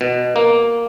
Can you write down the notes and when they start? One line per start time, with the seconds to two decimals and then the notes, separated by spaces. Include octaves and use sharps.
0.01 B2
0.36 A#3